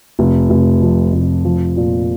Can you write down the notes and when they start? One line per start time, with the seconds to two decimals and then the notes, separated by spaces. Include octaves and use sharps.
0.19 F1
0.50 F1
0.82 F2
1.13 F1
1.45 F3
1.77 A#2